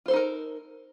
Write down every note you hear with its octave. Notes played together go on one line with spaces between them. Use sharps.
D#4 F4 A4 A#4 C5